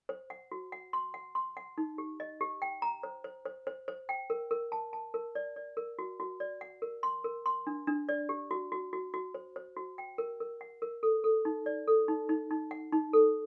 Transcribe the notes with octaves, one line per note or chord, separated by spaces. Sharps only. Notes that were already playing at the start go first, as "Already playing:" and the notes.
C5
F#5
F#4
F#5
C6
F#5
C6
F#5
D#4
G4
D#5
G4
G5
A#5
C5
C5
C5
C5
C5
G5
A#4
A#4
A5
A5
A#4
D5
D5
A#4
F#4
F#4
D5
F#5
A#4
C6
A#4
C6
D4
D4
D5
G4
F#4
F#4
F#4
F#4
C5
C5
F#4
G5
A#4
A#4
F#5
A#4
A4
A4
D#4
D5
A4
D#4
D#4
D#4
F#5
D#4
A4